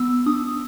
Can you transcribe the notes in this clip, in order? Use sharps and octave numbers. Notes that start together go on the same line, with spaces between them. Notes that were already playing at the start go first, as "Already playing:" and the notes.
Already playing: B3 E6
D4 D#6